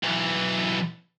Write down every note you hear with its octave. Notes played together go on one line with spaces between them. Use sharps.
B1 E3